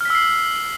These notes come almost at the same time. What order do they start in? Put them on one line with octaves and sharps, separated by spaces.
F6 B6 E6 C7